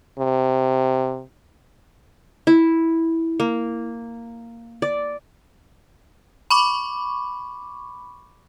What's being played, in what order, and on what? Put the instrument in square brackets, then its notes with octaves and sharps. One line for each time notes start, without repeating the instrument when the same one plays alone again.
[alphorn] C3
[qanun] E4
A#3
D5
[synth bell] B5 C#6 D6